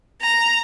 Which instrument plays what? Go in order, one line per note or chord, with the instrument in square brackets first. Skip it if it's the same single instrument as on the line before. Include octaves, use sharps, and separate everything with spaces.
[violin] A#5